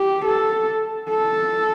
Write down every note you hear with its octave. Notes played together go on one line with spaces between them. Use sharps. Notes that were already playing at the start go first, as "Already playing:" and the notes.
Already playing: G4
A4
A4